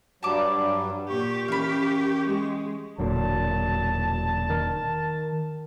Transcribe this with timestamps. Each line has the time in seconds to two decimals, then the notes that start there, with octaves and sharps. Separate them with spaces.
0.23 G2 F#3 G3 A5 D6
1.09 A#2 G4 C#6
1.48 E3 C#4 G4 A#4 F5 B5
2.28 G#3
2.99 E1 A#2 D3 F#3 A5
4.50 D#3 A#4